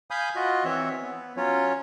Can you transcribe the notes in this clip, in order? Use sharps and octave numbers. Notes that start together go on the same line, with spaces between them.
F5 G#5 B5 D#6 G6
F4 F#4 D#5
E3 C4 C#5 E5
B3
F#3 C#4 F4 C#5